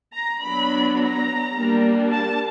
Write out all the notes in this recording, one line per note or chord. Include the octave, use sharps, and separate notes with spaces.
A#5
F#3 B3 D4 B5
A#5
G3 A#3 D4
A5